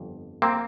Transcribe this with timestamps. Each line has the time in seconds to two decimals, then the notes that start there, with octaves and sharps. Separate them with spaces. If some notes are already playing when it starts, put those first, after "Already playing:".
Already playing: G1 F2
0.42 A#3 C4